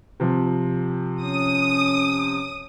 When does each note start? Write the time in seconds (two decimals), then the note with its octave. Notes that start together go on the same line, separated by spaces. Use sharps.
0.20 C3 F3
1.23 C#4 D#6